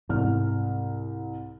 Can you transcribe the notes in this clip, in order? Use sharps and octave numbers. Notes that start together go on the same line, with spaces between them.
C2 G#2 F6